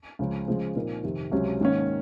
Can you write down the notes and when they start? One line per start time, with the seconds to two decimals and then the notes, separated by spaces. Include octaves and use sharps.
0.19 C#2 C#3 F3
0.48 C#3 F3 G#3
0.76 A#2 F3 C4 D#4 A#4
1.04 F2 C3 D#3
1.32 C#2 C3 F#3 C#4
1.61 G#2 D#3 A#3 C#4